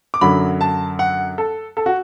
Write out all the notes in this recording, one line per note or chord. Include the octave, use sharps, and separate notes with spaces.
D6
F#2 D3 F#3 B5
A5
F#5
A4
A4
F#4